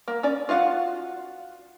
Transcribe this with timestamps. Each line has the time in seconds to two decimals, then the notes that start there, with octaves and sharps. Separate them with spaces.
0.08 A#3
0.23 C#4 D5
0.49 F4 F#4 F5 F#5